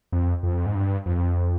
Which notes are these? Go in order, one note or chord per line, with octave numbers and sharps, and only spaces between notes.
F2
F2
G#2
G2
F2